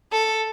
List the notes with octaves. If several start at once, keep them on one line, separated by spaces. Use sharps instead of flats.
A4